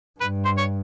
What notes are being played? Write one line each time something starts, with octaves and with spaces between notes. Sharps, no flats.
G2 B4
C5
C#5